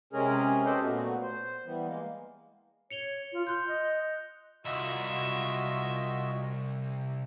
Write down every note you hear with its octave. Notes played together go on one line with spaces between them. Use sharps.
C3 G#3 C#4 G#4 A#4
C#4 G4 A4 B4 C5 D#5
A#2 F#3 A3 B3 F#4
C5
E3 G3 B3
G#3 A#3
C#5 C#7 F7 G7
F4
C6 F#6 G6
D#5
C2 F4 F#4 D#5 E5